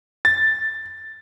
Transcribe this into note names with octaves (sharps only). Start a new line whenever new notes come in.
A6